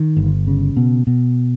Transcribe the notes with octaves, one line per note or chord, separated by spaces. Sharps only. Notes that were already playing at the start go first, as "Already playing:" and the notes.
Already playing: D#3
G1
C#3
B2
B2